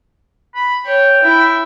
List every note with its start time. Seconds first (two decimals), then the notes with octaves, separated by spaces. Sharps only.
0.55 B5
0.86 C#5 G5
1.22 E4